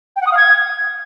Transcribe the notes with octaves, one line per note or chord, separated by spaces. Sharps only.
G5
F#5
D#6
F5
G#6